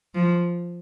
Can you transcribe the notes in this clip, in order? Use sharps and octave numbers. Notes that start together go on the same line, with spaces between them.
F3